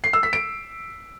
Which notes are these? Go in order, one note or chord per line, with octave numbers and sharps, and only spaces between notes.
C7
E6
B6
D7